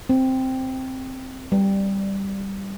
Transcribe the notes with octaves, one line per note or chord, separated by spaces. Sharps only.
C4
G3